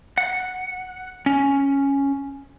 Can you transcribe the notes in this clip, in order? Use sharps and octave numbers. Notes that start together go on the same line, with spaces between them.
F#5
C#4